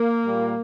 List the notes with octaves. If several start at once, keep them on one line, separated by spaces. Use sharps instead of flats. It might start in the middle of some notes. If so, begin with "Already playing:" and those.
Already playing: A#3
A#2 G3